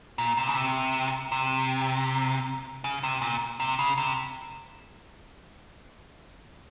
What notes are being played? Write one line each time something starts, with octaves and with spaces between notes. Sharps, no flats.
A#2
C3
C#3
C3
C3
C#3
C3
A#2
C3
C#3
C3